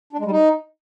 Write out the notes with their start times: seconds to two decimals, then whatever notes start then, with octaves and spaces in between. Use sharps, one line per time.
0.13 D4
0.19 G#3
0.25 G3
0.31 D#4